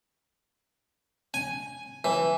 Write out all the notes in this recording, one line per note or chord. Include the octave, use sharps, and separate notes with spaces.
G#5
E3